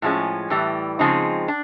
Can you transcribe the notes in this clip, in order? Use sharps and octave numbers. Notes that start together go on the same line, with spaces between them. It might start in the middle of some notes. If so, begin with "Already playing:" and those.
A2 F3 G#3 C#4
A2 E3 G3
C#3 F3 G#3 C4 D#4
D4